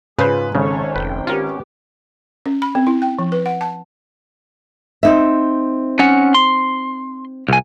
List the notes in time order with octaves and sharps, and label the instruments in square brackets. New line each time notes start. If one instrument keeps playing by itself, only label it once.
[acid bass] G#2 [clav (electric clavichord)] C#3 C5 [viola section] F4 G#4 [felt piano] B4
[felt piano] G#1 [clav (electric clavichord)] C#3 [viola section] C#4 A4 C#5
[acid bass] F1 [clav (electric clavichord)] B4 [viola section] G5
[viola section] B3 G4 [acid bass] C#4 [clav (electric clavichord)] F4 A#4
[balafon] C#4
B5
C4
E4
G5
F3
B4
F#5
A5
[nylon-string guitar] C4 D#4 E5
[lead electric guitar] C#4 F#5
C6
C2 G#5